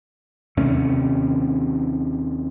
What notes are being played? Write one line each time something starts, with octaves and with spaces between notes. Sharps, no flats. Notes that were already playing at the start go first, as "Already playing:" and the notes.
D#2 C3 A3 C#4